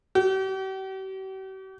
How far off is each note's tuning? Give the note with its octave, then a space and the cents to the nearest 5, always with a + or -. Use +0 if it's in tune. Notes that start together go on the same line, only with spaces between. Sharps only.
G4 -45